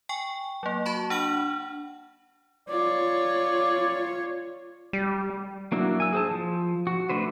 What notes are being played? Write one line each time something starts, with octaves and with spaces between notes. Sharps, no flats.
G5 G#5 C#6
F#3 A#3
F#4 A5 B5 C#6
D4 F#5 F6 F#7
F4 C#5 D5
G3
F#3 A#3 D4 E4 F#4
G#5 E6
G#4 C5 A5
F3
F#4
A3 D4 B4 C5